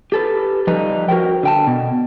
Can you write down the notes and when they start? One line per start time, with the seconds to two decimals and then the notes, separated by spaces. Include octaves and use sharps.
0.12 G4 A4 B4
0.67 F3 G3 D#4 B4
1.08 F#4 A#4 C5 G5
1.43 D3 G5 A5
1.67 B2